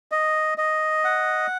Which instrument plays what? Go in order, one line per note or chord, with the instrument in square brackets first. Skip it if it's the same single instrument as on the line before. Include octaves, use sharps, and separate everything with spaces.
[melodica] D#5
D#5
F#5